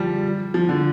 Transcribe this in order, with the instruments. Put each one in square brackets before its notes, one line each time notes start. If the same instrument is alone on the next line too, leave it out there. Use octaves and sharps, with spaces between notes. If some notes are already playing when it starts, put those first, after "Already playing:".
Already playing: [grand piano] F3 G3
F3
D3